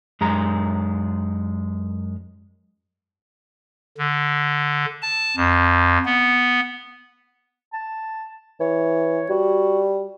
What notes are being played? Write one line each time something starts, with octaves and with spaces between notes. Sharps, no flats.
F#2 G#3 A#5
D3
A5
F2
B3
A5
E3 C#5
G3 F#4